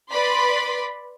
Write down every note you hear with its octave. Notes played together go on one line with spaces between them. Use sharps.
B4 D5 B5 C6